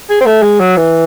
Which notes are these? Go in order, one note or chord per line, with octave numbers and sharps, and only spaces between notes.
G#4
C4
A3
G#3
F#3
E3